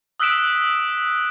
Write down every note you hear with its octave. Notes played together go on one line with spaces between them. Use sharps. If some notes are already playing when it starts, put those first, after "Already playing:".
D#6 E6 F#6 B6 D7 E7